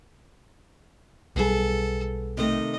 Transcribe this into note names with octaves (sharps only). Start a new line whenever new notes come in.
B1 G3 B3 G#4 A4
C3 D#3 A3 D#5